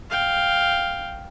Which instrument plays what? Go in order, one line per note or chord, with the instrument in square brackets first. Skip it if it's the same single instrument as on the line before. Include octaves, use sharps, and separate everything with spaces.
[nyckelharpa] F5 G5